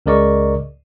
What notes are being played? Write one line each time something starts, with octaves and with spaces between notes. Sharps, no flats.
C#2 C#3 A#4 D5 D#5 C#6